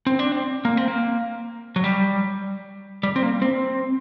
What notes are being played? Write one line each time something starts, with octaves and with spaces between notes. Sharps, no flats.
C4
D4
C4
A#3
C4
A#3
F#3
G3
G3
C4
A#3
C4